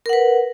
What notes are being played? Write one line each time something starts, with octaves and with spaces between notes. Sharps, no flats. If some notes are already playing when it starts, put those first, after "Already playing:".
A#4 B4 F#5